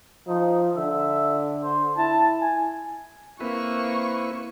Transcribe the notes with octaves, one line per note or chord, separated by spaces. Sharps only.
F3 D#4
D3 E5
C5
E4 A5
G#5
A#3 C4 E4 B4 C#6